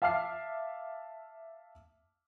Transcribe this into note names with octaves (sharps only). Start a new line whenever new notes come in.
E5 F5 A5 D6 F6 C7